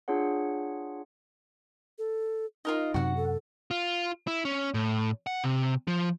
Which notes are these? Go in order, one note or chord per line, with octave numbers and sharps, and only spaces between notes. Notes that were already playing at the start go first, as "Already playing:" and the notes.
D4 F4 G#4 C#5 F#5
A4
D#4 F4 A#4 D#5
F#2 C3 F#4 F#5
A4
F4
E4
C#4
A2
F#5
C3
F3